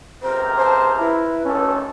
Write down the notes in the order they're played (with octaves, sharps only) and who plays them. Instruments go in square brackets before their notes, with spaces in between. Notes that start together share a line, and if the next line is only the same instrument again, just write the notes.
[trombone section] C#2 C3 A#4 [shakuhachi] C5
[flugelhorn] C5 [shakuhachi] A5
[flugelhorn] E4 [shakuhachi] B4
[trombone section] G#1 D2 A4 [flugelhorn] C#4